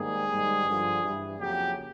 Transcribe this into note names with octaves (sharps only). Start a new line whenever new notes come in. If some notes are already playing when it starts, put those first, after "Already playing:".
Already playing: G#2 D#3 G3 A#3 G#4
G#2 D#3 G3
G2 D3 F3
G2 E3 G3
F2 C#3 F#3 A#3 G4